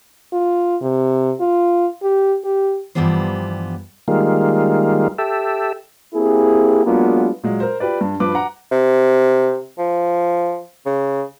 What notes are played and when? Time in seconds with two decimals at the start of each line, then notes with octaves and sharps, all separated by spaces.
0.33 F4
0.82 C3
1.40 F4
2.03 G4
2.45 G4
2.95 G2 E3 F3 G3 B3 C5
4.08 D#3 G3 G#3 A#3 F4
5.18 G4 A4 E5
6.15 A#3 C4 E4 G4 G#4
6.86 F#3 G#3 A#3 B3 D4 F4
7.43 A#2 F#3 G#3
7.60 A#4 C5
7.80 F4 G4 B4 D5
8.01 G2
8.20 G2 F3 B4 D6
8.35 F#5 A#5
8.71 C3
9.78 F3
10.86 C#3